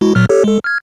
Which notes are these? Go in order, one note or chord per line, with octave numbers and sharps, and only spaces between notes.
G#3 E4 F#4
A#2 F#3 F6
G4 A4 C#5
G#3 A4
F6 G#6